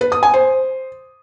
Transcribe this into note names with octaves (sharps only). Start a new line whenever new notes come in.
B4
D#6
G#5
C5